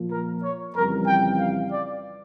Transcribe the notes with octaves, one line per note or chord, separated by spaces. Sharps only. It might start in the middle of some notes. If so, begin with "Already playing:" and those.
Already playing: A#2 F3
A#4
C#5
F2 C#3 E3 G3 A#4
G5
F5
D5